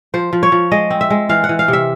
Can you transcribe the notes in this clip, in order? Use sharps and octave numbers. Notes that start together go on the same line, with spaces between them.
F3 C5
F3
C#5
F3
G#3 D#5
C4
E5
G#3
E3 F5
F#5
E3
F5
C3
E5